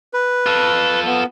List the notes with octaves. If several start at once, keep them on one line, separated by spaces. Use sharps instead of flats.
B4
F4 A4
B3